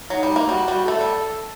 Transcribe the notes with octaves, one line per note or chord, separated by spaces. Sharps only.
F#3 D#4
G3
A#3
G3 F#4
G3
A3 A4
G3